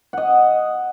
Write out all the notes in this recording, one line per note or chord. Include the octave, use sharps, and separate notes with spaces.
D#5 F#5